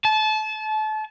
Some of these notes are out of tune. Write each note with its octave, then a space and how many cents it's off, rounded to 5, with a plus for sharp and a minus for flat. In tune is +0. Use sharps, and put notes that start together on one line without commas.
A5 -30